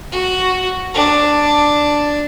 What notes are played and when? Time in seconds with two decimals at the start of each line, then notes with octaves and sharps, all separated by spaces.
0.12 F#4
0.94 D4